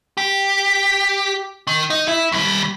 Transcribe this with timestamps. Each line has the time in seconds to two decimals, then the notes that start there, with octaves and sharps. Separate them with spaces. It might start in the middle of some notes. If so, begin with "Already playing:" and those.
0.17 G4
1.67 D#3
1.90 D#4
2.08 E4
2.32 D#2 G3